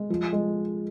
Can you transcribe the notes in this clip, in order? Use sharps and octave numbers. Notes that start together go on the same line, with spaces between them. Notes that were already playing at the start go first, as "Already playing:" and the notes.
Already playing: G#3
F3
G#3